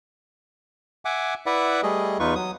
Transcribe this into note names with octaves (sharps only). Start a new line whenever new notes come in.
E5 F#5 G#5 D6
E4 B4 D5 E5 F#5
G3 A3 G#4 D#5
E2 D#4 F4 B4 C#6
F#3 D#6